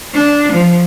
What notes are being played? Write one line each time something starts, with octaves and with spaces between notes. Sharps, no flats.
D4
F3